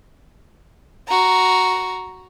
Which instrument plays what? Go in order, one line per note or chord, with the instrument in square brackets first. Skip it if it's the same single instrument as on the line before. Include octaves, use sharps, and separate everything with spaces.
[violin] F#4 A#5